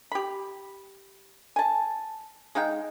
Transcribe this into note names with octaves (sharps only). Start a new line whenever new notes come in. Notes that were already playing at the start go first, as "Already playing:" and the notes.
G4 B5
G#5 A5
G#3 D#4 F5 G5